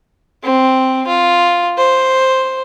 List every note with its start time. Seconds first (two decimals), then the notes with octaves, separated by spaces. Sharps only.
0.43 C4
1.07 F4
1.78 C5